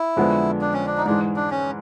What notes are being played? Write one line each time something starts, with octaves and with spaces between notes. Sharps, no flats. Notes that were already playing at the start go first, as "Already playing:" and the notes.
Already playing: E4
F2 D3 F3 G#3 B3
D4
C#4
D4
D#4
G#2 E3 G#3 D4
D4
C#4